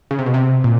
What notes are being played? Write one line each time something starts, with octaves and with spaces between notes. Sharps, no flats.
C#3
C3
B2
C3
A#2